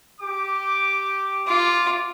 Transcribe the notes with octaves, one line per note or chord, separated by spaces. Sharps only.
G4 D6
F4 D6